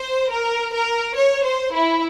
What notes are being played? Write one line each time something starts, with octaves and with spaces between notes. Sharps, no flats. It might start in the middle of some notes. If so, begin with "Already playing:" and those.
Already playing: C5
A#4
A#4
C#5
C5
E4